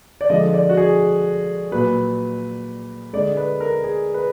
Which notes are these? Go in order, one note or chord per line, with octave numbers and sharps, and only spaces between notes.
D5
D3 F3 G#3 D#5
D5
F#4
G#4
A#2 F#3 B4
D3 G#3 D5
B4
A#4
G#4
B4